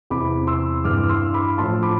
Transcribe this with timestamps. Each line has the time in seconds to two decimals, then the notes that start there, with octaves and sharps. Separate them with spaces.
0.10 E2 C3 E3 B5 D6
0.47 C6 E6
0.84 G2 E3 D6 F6
0.97 D6
1.09 C6 E6
1.34 B5 D6
1.58 A2 F3 A5 C6
1.83 B5 D6